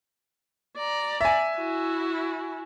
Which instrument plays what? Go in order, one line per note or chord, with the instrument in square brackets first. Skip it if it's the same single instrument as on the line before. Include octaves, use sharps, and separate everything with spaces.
[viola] D5 A#5
[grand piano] E5 G#5
[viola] E4 F#4